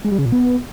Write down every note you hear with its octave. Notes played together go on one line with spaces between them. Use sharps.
G#3
G3
C#3
A#2
B3